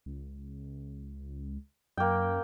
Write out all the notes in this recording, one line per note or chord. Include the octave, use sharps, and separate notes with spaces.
C#2
F#2 A#3 G5